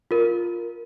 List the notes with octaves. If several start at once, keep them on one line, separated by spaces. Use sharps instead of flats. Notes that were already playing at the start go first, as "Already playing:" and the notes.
F4 A#4